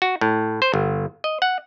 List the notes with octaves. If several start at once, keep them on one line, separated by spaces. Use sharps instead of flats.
F#4
A2
C5
G1
D#5
F#5